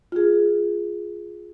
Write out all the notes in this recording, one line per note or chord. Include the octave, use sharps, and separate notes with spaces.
F4 G#4